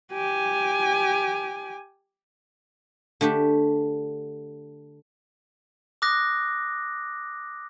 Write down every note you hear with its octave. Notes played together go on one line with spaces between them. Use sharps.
G4 G#5
D3 A3 D4 G4
D6 D#6 F#6 A#6